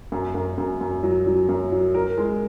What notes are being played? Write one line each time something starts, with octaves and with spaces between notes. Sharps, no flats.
F#2
F#2
F#2
F#2
F#3
F#3
F#2
F#3
A#4
G#3